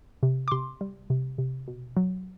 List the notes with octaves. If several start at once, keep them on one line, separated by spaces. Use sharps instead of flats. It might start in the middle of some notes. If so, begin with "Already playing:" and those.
C3
D6
C3 C6
G3
C3
C3
B2
F#3